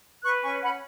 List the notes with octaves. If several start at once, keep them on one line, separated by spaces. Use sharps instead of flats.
B4 C#6 F#6
C#4 G#5 C#6
C#4 F#5 B5